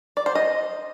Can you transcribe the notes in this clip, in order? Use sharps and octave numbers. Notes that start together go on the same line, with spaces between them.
D5
C5
D#5